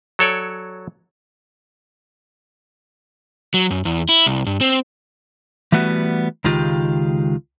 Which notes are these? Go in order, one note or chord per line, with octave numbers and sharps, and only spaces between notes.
F#3 A4 C#5 D5
F#3
F#2
E2
E4
C2
G2
C4
E3 G3 A3 B3 F#4
C#2 D#3 G#3 F4 G4